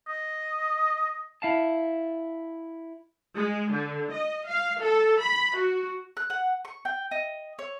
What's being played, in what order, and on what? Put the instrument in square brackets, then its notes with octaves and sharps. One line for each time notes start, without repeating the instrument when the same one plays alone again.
[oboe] D#5
[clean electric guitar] E4 F5 A5
[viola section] G#3
D3
D#5
F5
A4
B5
F#4
[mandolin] F#6
F#5
C#6
G5
D#5
C#5